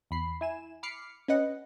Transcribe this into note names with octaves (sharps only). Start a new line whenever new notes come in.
E2 B5 C7
E4 G#5 E7
B5 D6 F6 C7 C#7
C#4 B4 D#5 F#5